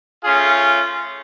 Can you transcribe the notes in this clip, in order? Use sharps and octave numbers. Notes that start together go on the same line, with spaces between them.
A3 C#4 F4 G#4